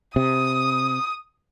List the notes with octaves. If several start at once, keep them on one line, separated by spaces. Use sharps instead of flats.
C3 D#6